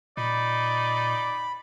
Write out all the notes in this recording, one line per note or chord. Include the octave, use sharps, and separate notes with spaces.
A#2 D#4 D5 B5